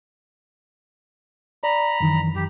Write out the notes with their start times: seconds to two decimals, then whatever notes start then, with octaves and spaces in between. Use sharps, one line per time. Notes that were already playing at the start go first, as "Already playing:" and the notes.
1.63 D5 A#5 B5
2.00 F#2 D#3 E3
2.36 F#2 G4